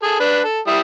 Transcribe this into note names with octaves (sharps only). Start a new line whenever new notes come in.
G#4 A4
D4 B4
A4
G3 E4 D#6